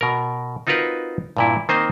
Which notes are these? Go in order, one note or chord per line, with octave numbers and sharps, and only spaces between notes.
B2 A#4
C4 D#4 F4 F#4 A#4 B4
G2 A#2 E4
D#3 A#3 C4 C5 D#5